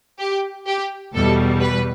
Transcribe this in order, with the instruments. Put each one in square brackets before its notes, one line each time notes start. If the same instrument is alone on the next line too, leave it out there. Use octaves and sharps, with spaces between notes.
[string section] G4
G4
E2 B2 G3 A4
B4